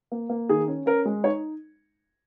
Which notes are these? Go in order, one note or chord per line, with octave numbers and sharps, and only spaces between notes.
A#3
A#3
D#3 G#4
C#4
C#4 A#4
G#3
D#4 C#5